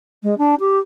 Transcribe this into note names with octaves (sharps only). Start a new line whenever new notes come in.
G#3
D4
G4